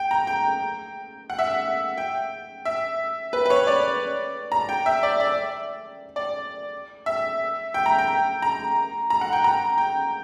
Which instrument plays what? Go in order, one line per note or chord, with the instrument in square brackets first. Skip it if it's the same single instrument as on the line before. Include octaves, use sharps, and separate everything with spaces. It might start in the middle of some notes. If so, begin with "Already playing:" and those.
Already playing: [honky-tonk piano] G5
A#5
G5
F#5
E5
F#5
G5
E5
B4
B4
C#5
D5
A#5
G5
E5
D5
D5
D5
E5
G5
A#5
G5
A#5
A#5
F#5
G5
A#5
G5